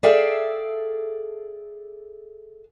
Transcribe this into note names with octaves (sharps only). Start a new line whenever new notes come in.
G#4 A4 D5 E5 F5 G5